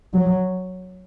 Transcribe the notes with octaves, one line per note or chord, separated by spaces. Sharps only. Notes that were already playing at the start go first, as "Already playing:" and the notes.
F#3